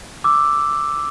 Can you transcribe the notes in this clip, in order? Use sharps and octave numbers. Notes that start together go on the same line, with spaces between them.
D6 E6